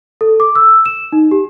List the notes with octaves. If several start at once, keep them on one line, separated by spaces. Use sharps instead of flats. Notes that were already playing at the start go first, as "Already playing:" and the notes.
A4
D6
E6
E7
D#4
G4